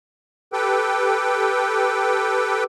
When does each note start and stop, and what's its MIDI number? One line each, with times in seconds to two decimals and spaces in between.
0.53 2.64 67
0.53 2.64 69
0.53 2.64 71
0.53 2.64 79